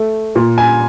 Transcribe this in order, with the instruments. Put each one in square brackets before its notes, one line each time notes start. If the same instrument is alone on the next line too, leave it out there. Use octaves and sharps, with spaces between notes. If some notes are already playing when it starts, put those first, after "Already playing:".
Already playing: [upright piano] A3
A#2
[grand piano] G#5